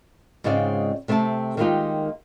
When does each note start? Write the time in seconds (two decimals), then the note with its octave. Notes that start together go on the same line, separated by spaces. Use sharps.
0.44 G#2 C#3 G#3 C4 F4 D5
1.08 C3 A3 C4 E5 A5
1.57 D#3 G#3 A#3 D#4 F4 G4